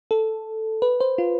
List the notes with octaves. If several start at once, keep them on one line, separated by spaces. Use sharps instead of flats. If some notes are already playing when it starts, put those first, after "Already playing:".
A4
B4
C5
F4